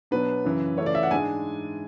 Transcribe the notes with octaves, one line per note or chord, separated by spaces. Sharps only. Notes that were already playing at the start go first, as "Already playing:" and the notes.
B2 F#3 B3 D4 B4
F#2 C#3 E3
C#3 E3 A3 C#4 E4 C#5
D5
E5
F#5
G#2 G#3 D4 G#5